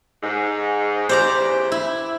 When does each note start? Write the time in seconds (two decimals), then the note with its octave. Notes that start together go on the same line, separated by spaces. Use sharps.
0.23 G#2
1.09 E2 C#3 G4 C5 D5 A#5
1.72 E4